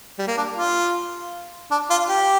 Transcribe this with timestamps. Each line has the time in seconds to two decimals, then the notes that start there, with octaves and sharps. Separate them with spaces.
0.19 G3
0.28 A#3
0.37 D4
0.57 F4
1.71 D4
1.90 F4
2.09 G4